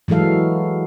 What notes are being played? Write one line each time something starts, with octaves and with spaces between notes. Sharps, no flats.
E3 F#3 G#3 A4 F5